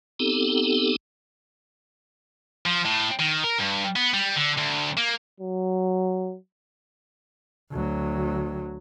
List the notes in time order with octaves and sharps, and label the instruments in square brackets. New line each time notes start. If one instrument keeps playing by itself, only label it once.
[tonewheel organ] B3 C4 D#4 G4 A4
[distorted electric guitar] F3
A2
D#3
A#4
G2
B3
G3
D3
D2
A#3
[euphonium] F#3
[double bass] D2 F#3